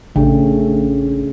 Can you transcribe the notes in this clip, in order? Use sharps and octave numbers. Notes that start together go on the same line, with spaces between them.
A1 C#3 A3 D4